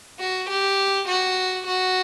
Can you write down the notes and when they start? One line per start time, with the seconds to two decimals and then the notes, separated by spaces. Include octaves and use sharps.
0.19 F#4
0.49 G4
1.08 F#4
1.67 F#4